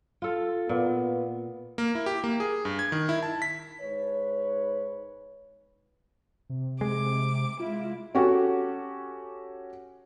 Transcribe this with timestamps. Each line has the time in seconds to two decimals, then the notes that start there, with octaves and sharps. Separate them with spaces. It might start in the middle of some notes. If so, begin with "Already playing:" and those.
0.22 F4 A4
0.69 A#2 B3
1.78 A#3
1.95 E4
2.06 G4
2.24 A#3
2.40 G#4
2.65 G2
2.79 G#6
2.92 D#3
3.09 E4
3.23 A5
3.42 B6
3.82 G#2 B4 C#5
6.50 C3
6.81 G#3 D6
7.60 G#3 E4 F4
8.15 C#4 F#4 G4 A4